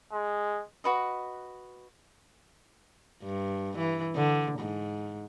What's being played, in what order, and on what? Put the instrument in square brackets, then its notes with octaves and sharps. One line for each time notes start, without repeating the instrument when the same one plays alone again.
[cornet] G#3
[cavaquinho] F#4 B4 D#5
[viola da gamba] G2
E3
D3
G#2